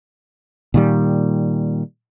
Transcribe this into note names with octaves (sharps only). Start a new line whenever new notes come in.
A#2 D#3 G3